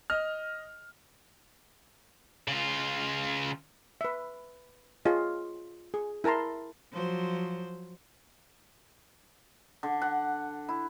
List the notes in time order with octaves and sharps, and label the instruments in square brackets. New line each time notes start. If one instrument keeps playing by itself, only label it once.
[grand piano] D#5 F6
[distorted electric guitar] C#3 F4
[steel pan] B4 E5
F4 G#4 C#5 D#5
G#4
E4 A#4 A5 A#5 C6
[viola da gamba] F3 F#3 C5
[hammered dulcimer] D3
F#5
E4